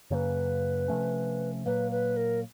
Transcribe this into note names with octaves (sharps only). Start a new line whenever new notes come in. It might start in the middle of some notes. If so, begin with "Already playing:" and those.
F#2 C#3 F#3 A#3 B4 C#5
C3 F3 A3 C#4
A#2 F#3 A#3 B4
B4
A#4